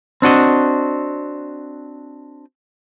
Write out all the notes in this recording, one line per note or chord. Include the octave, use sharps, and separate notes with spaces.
C4 D4 F#4 D#5